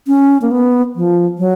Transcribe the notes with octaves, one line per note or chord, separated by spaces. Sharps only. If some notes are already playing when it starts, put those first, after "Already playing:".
C#4
A#3
B3
F3
F#3